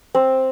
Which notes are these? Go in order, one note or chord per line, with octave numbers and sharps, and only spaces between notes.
C4